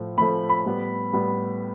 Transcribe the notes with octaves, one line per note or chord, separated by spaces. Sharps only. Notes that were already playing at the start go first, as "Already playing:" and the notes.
Already playing: A2 F3 A3
A2 F3 A3 B5
B5
A2 G3 B3
A2 G3 B3